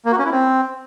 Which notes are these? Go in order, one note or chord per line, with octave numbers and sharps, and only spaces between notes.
A#3
F#4
C#4
E4
C4